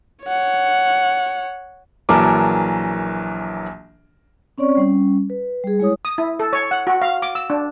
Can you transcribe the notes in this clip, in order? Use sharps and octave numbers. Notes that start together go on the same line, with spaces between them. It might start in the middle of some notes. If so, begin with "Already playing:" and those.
C#5 F#5
A#1 E3 F#3 A#4 A5 D6
C4 C#4 C#5 D5 C#6
G3 C#4
B4
G3 G#4
G#3 E4 C#5 D#6
D#6
E4
A4
C#5
F#5
F#4
F5
D6
E6
D4